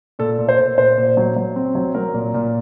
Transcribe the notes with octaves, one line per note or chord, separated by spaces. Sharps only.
A#2 A4
A#2
C5
A#2
A#2 C5
A#2
F#3
F#3
C4
F#3
F#3 A#4
A#2
A#2